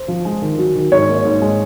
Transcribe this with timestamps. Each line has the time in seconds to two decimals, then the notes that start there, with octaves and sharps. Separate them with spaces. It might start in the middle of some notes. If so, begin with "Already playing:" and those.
Already playing: C5
0.08 F3
0.25 G#3
0.42 D#3
0.58 F#3
0.76 D#3
0.92 G#2 C#5
1.08 A#3
1.25 G#2
1.42 G#3